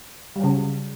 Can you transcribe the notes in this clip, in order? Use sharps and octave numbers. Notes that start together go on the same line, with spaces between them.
C#3 F#3 G3